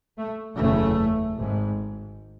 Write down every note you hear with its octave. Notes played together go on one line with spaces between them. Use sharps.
A3
F#1 E2 C#3 A3
G#1 G#2